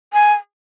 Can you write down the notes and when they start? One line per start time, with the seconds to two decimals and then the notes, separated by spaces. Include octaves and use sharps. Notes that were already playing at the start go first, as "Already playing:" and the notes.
0.13 G#5